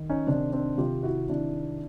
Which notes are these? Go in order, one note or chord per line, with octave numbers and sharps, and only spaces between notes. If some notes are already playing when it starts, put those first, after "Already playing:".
Already playing: D#3
C#4 D#4
C3 D#3 C4 D4
C4 D4
C3 D#3 F4 G4
E4 F#4
C3 D#3 D4 E4